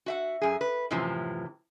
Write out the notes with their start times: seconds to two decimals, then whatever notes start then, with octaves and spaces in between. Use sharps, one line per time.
0.06 F#4 E5 F#5
0.41 F#2 G#4
0.61 B4
0.91 F#2 A2 C3 E3 F3